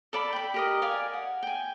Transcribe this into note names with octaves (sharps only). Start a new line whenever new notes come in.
A4 D5 B5
G5 B5
G4 A#4 D#5
D5 F5 G#5
F#5
G5 G#5